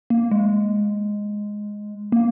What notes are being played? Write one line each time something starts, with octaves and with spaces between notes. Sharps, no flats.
A#3
G#3
A#3